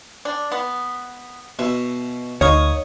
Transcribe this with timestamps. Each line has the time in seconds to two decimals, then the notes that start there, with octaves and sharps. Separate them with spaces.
0.25 D4
0.52 B3
1.59 B2 E5
2.41 D2 A#3 D#4 C#5 C#6 D#6